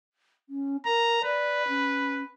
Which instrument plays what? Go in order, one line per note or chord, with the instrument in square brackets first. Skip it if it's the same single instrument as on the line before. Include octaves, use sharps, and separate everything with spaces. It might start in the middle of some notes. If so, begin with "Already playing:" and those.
[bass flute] C#4
[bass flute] A#4 [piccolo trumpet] A#5
[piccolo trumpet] B4 [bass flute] D5
[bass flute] C#4